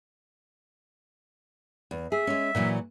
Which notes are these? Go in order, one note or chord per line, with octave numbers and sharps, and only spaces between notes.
E2
G#4 E5
G#3 C#4
A#2 E3 F#3